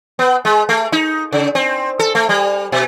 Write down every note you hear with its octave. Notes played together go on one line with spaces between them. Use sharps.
B3
G#3
A3
D#4
C#3
C4
A4
A3
G3
B2